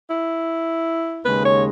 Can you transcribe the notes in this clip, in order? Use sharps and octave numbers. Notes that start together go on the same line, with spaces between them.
E4
D#2 C#3 G#3 B4
C#5